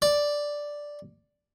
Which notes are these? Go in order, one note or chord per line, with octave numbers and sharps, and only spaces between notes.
D5